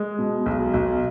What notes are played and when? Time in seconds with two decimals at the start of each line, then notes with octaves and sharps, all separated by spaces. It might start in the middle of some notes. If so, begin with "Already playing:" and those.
Already playing: G#3
0.19 B2
0.46 B1
0.74 B1